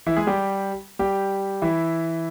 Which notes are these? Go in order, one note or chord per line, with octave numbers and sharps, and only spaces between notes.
E3 E4
G#3 G#4
G3 G4
G3 G4
E3 E4